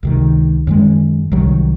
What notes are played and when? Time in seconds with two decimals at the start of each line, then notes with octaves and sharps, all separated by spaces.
0.03 C#2 C3 D#3
0.67 F#2 D#3 G#3
1.32 C2 C3 D#3 F#3